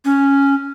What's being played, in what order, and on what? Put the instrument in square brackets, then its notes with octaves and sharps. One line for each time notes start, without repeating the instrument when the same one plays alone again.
[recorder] C#4